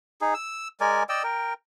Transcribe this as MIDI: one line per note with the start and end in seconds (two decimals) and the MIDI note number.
0.21 0.34 63
0.21 0.34 68
0.34 0.68 88
0.81 1.03 56
0.81 1.03 70
0.81 1.03 74
0.81 1.03 80
1.09 1.23 74
1.09 1.23 75
1.09 1.23 79
1.09 1.23 88
1.24 1.54 70
1.24 1.54 79